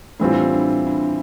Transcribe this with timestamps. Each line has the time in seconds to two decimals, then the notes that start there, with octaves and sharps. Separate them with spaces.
0.20 A2 E3 G3 C4 D4 F4
0.53 D4
0.87 D4